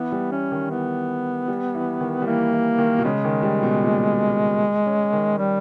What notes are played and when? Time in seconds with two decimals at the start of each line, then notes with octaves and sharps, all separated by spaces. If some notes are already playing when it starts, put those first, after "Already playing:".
Already playing: E3 B3
0.12 G3
0.31 E3 C#4
0.52 D#3
0.70 E3 B3
1.48 G3
1.75 E3
2.00 D#3
2.22 G3
2.26 E3 A#3
2.52 E3
2.79 D#3
2.99 B2
3.04 C#3 G#3
3.25 D#3
3.43 G3
3.63 B2
3.83 A#2
4.86 C#4
5.13 D#3
5.38 G3